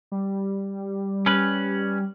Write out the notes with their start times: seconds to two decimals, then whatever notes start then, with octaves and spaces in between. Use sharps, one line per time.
0.12 G3
1.26 C#4 B4